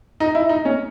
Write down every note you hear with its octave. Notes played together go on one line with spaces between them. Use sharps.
D#4
E4
D#4
C#4